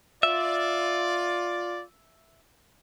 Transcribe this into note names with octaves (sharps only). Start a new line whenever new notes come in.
F4 D5 E5